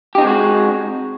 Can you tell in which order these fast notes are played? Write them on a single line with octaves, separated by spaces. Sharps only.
G4 D#4 C4 G#3 F#4